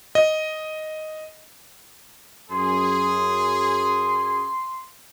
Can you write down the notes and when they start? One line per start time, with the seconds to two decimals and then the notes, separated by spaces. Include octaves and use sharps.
0.15 D#5
2.51 F#2 G#4 C6